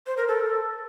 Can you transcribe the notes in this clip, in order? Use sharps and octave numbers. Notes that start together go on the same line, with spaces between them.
C5
A#4
A4